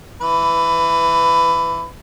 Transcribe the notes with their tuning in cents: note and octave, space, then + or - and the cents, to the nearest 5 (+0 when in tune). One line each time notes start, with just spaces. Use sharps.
E3 +0 B4 +20